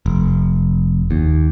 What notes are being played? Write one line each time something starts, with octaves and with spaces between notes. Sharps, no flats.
F1
D#2